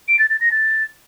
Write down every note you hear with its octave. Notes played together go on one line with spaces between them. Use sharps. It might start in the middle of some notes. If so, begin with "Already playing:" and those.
D7
A6
A6
A#6
A6